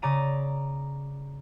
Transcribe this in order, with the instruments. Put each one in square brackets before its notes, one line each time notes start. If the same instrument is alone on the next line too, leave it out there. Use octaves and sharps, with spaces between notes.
[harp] C#3 D5 A#5 D#7